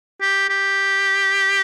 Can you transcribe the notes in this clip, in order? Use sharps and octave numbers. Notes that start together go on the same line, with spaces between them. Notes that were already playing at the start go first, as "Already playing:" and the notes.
G4
G4